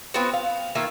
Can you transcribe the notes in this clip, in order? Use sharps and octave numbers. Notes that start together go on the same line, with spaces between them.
B3 C4 F4 F#4
F5
D#3 A#3 F4 E5